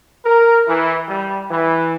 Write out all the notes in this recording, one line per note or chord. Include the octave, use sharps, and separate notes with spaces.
A#4
E3
G3
E3